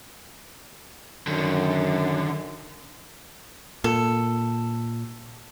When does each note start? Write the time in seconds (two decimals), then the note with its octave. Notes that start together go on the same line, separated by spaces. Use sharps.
1.27 F#2 D3 D#3
3.84 A#2 A4